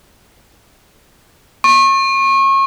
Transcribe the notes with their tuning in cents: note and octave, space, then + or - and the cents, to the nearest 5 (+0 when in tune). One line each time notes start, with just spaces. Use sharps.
C#6 -35